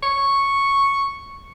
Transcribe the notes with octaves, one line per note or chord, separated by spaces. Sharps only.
C#6